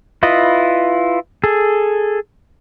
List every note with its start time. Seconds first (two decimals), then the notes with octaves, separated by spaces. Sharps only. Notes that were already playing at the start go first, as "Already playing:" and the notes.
0.23 E4 F4 B4 D#5
1.44 G#4 A4